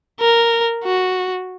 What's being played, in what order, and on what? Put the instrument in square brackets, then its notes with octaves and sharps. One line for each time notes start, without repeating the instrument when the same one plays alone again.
[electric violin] A#4
F#4